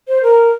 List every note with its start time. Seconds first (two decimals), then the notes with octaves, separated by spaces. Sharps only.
0.08 C5
0.23 A#4